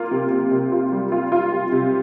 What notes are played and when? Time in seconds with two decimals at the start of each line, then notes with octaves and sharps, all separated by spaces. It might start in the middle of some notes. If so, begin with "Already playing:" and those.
Already playing: A#3 F4
0.11 C3
0.32 C3
0.51 C3
0.72 F4
0.92 G3
1.12 F4
1.32 F4
1.52 C3
1.72 C3